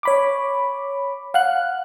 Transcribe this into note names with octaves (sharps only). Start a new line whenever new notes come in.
C#5 B5 D6
F5 F#5 F#6